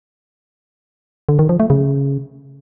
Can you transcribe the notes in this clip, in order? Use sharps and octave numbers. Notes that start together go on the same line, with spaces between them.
D3
D#3
F3
A3
C#3